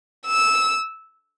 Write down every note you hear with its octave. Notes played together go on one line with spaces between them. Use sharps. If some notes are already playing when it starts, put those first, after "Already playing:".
E6